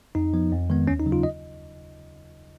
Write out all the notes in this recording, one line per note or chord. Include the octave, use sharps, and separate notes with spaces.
F2 D#4
F3 B3
F2
D#3 G#3 B3
D#2 C#4
D#4
C#3 F#3
F4
D#5